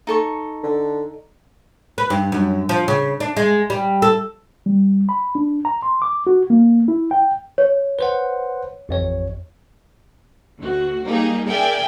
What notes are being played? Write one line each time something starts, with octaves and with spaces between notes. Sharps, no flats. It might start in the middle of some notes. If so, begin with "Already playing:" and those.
D#4 A4 C#6
D3
B4
G2
F#2
F3
C#3
D4
G#3
G3
A4
G3
B5
D4
A#5
C6
D6
F#4
A#3
E4
G5
C#5
B4 C5 F#5
A1 F2 C#5
D2 F#4
G3 A#3 D#4 G4 G#4
G#4 A#4 D5 E5 G5 G#5